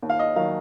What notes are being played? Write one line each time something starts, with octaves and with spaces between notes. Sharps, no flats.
D#2
F5
D#5
D#3 F#3 F5